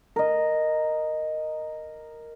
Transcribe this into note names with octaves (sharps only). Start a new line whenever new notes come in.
A#4 D#5